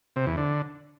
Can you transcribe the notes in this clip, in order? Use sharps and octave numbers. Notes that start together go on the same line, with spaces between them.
C3
E2
D3